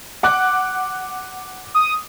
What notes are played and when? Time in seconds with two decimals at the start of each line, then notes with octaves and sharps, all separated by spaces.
0.23 F#5 D6 F#6
1.74 D#6